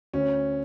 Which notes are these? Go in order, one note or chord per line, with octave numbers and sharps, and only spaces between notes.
D2 C#4